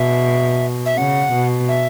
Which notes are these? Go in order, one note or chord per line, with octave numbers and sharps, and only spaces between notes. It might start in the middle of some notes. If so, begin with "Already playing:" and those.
Already playing: B2 E5
E5
C#3 F#5
B2
E5